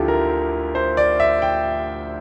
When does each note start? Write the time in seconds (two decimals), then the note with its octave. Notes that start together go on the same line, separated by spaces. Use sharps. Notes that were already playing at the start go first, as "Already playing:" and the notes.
Already playing: D2 D3 F3 E4 F4 G4 A4
0.08 A#4
0.75 C5
0.97 D5
1.20 E5
1.42 G5